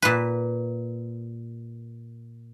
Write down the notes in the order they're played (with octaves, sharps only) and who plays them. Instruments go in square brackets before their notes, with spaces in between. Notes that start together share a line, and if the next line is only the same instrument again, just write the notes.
[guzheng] A#2 B4